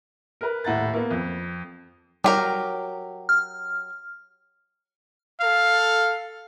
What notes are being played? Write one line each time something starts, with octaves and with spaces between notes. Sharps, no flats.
A#4 B4
D#1 A2 F#5 A#5 A6
A#3 B3
F2
F#3 G3 G4 A#4
F6
A4 F5